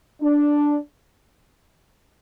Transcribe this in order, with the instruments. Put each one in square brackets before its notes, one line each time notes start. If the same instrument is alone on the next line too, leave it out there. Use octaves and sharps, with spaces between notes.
[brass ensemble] D4